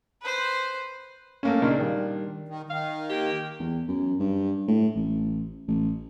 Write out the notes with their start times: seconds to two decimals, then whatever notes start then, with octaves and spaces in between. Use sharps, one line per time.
0.22 B4 C5
1.43 A3 A#3 C#4
1.62 A#2 C#3 D4 D#4 A#4
1.79 D#3 G3
2.48 D#3
2.70 D#3 F5
3.10 A#3 G4
3.60 E2
3.88 F#2
4.20 G2
4.68 A2
4.95 A1
5.67 A1